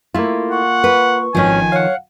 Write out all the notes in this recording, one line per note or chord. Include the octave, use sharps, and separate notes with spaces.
A3 A#3 E4 F4
F#5 C#6
B4
G#1 D#3 F3 C#4 G#5
C#5 F5 F#5